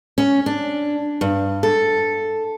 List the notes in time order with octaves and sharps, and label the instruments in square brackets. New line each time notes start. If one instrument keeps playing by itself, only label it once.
[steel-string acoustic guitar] C#4
D4
G2
A4